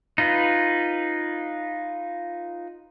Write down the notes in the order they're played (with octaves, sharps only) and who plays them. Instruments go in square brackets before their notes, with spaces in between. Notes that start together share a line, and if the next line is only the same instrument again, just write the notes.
[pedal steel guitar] D#4 F4 B4